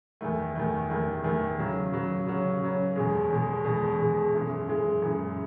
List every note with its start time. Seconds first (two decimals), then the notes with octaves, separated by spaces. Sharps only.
0.21 E2 D#3 A3
0.55 E2 D#3 A3
0.90 E2 D#3 A3
1.24 E2 D#3 A3
1.58 C#3 F#3 C#4
1.93 C#3 F#3 C#4
2.27 C#3 F#3 C#4
2.61 C#3 F#3 C#4
2.96 E2 B2 G#3
3.30 E2 B2 G#3
3.64 E2 B2 G#3
3.99 E2 B2 G#3
4.33 F#2 E3 G#3
4.68 F#2 E3 G#3
5.02 F#2 E3 G#3